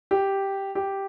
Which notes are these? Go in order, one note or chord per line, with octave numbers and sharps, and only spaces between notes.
G4
G4